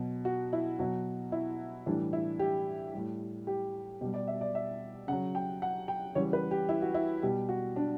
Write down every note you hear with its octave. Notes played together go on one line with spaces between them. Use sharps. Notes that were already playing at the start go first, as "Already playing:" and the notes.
Already playing: B2 F#3
F#4
E4
B2 F#3 F#4
E4
A2 E3 G3 D4
E4
G4
A2 G3
G4
B2 G3 G4
D5
E5
D5
E5
C#3 F#3 F#5
G5
F#5
G5
C#3 E3 G3 C#5
B4
G4
E4
F#4
E4
B2 G3 G4
F#4
D4